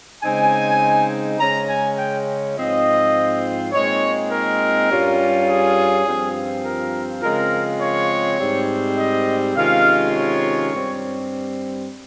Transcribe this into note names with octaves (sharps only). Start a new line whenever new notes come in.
C#3 G#3 C4 D#4 G#5
C#3 G#3 C#4 A#5
G#5
G5
G#2 F3 C4 F4 D#5
A#2 G#3 C4 D#4 C#5
A#4
G2 G3 C#4 F4
G#4
G2 F3 C4 F4
A#4
C#3 F3 G#3 C4 F4 A#4
C#5
G#2 G3 C4
D#5
C3 D#3 G#3 C#4 F4 F5
C#5
G2 G3 C4